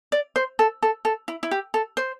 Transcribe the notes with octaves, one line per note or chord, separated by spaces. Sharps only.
D5
C5
A4
A4
A4
E4
E4
G4
A4
C5